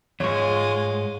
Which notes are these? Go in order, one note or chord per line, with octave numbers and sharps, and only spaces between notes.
E2 G#2 G#3 F4 C#5 C#6